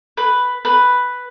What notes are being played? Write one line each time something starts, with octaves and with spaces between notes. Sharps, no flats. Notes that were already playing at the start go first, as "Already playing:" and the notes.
B4
B4